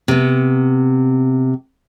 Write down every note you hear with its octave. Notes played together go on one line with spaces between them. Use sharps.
C3 B3